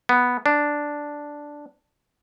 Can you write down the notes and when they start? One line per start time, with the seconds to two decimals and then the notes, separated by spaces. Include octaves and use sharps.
0.09 B3
0.46 D4